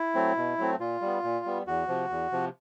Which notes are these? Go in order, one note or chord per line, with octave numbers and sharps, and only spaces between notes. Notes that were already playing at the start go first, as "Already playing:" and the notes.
Already playing: E4
F#3 A3 C4
B2
F#3 A3 C4
A#2 F4
G3 B3
A#2
G3 B3
E2 F#4
C3 F3
E2
C3 F3